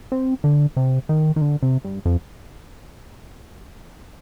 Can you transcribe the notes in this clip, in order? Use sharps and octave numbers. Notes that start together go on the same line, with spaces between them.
C4
D3
C3
D#3
D#3
D3
C3
G2
F2